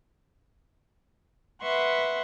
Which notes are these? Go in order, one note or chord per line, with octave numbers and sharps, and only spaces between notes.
B4 E5 F#5 C6 C#6